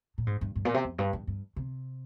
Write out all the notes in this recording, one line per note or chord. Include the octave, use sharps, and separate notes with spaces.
A#2
G#2
G2
G2
A#2
C3
F2
G2
G2
G2
C3